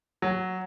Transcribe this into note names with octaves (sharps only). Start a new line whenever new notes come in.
F#3